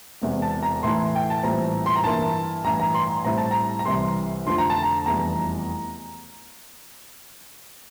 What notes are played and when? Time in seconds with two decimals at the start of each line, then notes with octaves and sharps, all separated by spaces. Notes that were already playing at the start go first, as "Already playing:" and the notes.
0.22 E1 E2 C3
0.42 A5
0.63 A#5
0.83 A2 E3 A3 E4 C6
1.16 G5
1.30 A5
1.43 A#1 A2 E3 G3 C4 A#5
1.86 C6
1.96 A#5
2.04 G2 E3 A#3 E4 A5
2.64 A1 G2 E3 A#5
2.80 A#5
2.94 C6
3.25 A2 G3 C4 E4 A#5
3.38 A5
3.51 A#5
3.79 A#5
3.85 C2 C3 E3 G3 C6
4.46 F2 D3 F3 A3 C6
4.58 A#5
4.70 A5
4.82 A#5
5.06 F1 E2 E3 G3 A#5